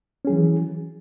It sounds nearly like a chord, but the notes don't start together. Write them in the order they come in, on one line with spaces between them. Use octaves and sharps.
C#4 G#4 F#3 E3